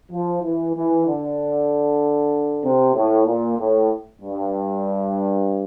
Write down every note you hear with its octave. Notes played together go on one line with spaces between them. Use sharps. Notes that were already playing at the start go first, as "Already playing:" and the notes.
F3
E3
E3
D3
C3
A2
A#2
A2
G2